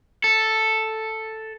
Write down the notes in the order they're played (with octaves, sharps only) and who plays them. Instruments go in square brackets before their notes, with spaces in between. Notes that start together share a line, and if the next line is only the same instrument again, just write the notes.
[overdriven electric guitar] A4